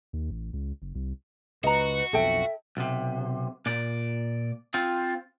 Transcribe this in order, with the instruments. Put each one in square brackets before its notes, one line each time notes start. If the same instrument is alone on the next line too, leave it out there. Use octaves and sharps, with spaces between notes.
[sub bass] D#2
A1
C#2
F#1
C2
[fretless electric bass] C#2 [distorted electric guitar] F#4 [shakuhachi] B4 [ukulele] D#5 A#5
[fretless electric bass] B1 F2 [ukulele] A4 G5 [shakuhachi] E5
[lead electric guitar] B1 C3
A#2 D5
C4 F4